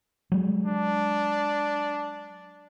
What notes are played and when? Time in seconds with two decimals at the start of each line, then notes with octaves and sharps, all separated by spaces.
0.32 F#3 G#3
0.66 D4